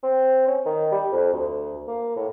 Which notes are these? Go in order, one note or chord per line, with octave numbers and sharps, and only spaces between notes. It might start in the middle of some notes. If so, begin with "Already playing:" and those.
C4
C#4
D#3
G3
F2
D2
A#3
A2